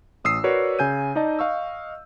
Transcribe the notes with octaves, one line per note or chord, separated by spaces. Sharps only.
A1 D#6 E6 C7
F#4 A#4 B4 C#5 D5
C#3 G#5 G6 D#7
D#4 D5 D#5 A5
D#5 F5 C#6 E6